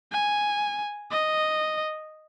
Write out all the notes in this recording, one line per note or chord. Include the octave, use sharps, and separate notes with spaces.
G#5
D#5